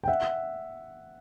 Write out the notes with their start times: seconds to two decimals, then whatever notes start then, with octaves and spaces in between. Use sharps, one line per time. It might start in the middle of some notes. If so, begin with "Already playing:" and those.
0.04 G5
0.08 E5 F#5